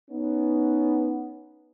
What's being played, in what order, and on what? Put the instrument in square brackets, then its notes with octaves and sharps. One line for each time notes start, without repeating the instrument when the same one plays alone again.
[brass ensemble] B3 C#4 D#4